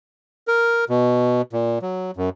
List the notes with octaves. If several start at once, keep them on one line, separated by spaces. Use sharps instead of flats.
A#4
B2
A#2
F#3
F#2